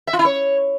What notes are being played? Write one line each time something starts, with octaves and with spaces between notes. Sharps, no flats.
E5
F4
E4
C#5